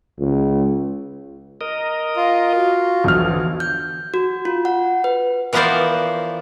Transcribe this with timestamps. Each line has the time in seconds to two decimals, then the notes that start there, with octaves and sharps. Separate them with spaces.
0.20 C#2
1.61 A#4 D#5
2.17 F4
2.55 F#4
3.04 B1 E2 D3 F3 F6
3.60 G6
4.14 F#4
4.45 F4
4.65 F#5
5.04 B4
5.53 E3 F3 B3 A#4 C5 D5